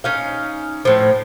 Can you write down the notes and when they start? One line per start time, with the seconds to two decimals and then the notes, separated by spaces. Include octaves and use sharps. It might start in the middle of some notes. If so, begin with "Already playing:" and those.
0.04 C#4 D#4 F5
0.85 A2 F3